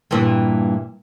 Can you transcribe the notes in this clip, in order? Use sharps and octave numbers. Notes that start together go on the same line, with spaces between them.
G2 A#2 E3